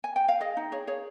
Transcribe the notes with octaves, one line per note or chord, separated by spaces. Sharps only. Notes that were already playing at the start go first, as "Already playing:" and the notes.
G#5
G5
F5
G#4 D#5
D#4
G#4 C#5
G#4 C#5